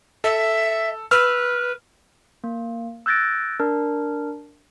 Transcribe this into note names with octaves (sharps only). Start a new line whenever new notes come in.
A4 E5
B4 E6 F6
A#3
E6 F#6 G6 A6 A#6 D7
D4 A#4